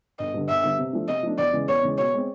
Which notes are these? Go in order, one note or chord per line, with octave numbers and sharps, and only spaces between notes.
G1 D#5
G2 D3
G1 E5
G2 D3
C3
F3 A3 D4
C3 D#5
F3 A3 D4
E2 D5
C#3 E3 G#3
E2 C#5
C#3 E3 G#3
B2 C#5
G#3 C4